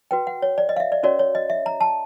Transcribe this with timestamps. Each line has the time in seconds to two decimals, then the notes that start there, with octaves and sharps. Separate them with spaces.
0.11 F#4 B4 G5
0.27 F#5
0.42 C#5
0.58 D5
0.69 D#5
0.76 F5
0.80 E5
0.92 D5
1.03 C#4 F#4 A#4 C#5 D5
1.19 C#5
1.35 D#5
1.50 E5
1.66 A#5
1.81 A5